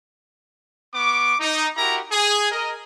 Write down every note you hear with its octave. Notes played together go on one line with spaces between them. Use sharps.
B3 C#6 D6
D#4
E4 F#4 G4 A#4 A#5
G#4
A#4 D#5